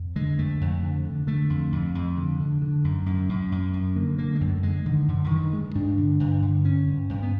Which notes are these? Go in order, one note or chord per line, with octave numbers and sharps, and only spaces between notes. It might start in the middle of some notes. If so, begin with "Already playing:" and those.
Already playing: F2
D3 G#3
F2 A3
F2
D3
D3
D3 A3
F2
F2
F2
D3
D3
D3
F#2
F#2
F#2
F#2
F#2
D3 A#3
D3 A#3
G#3
F#2 A3
D3 G#3
D3 D#3
F#2 D3
D3
G2 D#3
G2 G#3
G2 D4
D3
G2
D3
G2 C#4
G2
G2
B3